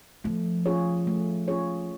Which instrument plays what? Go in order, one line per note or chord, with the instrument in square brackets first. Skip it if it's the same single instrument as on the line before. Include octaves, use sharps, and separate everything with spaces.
[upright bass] F3 [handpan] A3
[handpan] C#4 F4 G#4 C#5
A3
C#4 F4 G#4 C#5